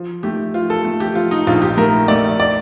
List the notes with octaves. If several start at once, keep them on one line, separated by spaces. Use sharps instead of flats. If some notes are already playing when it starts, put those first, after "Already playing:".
Already playing: F3
A3 G4
F3 F4
A4
A3
G4
F3 F4
D#4
A#1 F4
G4
A3 A#4
A3 D5
D5